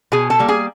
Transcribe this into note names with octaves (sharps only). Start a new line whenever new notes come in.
B2 G#4 G#5
A4 A5
G3 A#3
G#4 G#5